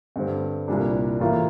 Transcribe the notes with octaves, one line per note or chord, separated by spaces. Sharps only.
G2 D3 G3 C4
C2 A#2 G3 D4
A2 E3 A#3 F4